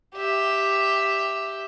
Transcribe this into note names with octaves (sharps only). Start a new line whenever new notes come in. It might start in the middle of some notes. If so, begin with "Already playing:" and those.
G4 E5